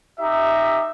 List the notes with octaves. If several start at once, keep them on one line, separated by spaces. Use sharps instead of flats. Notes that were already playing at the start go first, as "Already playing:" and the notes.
D#4 G4 E5